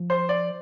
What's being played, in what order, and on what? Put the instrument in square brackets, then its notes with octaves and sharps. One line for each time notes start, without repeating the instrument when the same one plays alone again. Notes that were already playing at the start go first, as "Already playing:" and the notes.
Already playing: [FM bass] F3
[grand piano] C5
D5